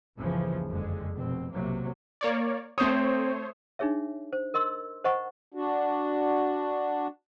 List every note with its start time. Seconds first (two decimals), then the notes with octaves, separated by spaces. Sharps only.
0.18 G1 D#2 C#3 E3 F3
0.67 F#1 F2 D3 G#3
1.14 F1 B2 C4
1.53 B1 C3 F#3 A#3
2.21 A#3 C#5 D5
2.78 A3 C4 C5 C#5 D#6
3.79 D4 D#4 G#4 C#5 E5
4.33 C5
4.54 A#4 D#5 C6 E6
5.04 C5 D#5 F#5 A#5 C#6
5.54 D4 F#4